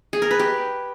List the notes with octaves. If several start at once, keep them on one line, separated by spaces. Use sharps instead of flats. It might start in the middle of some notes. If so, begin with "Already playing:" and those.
G#4
A#4
B4
G4